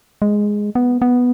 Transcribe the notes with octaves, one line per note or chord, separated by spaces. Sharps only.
G#3
B3
B3